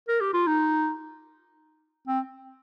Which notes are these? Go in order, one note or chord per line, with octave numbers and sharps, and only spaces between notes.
A#4
G4
F4
D#4
C4